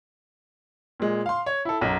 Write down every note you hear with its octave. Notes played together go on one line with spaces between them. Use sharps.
A#2 G#3
F5 C6
C#5
E4 A4
B1 F#2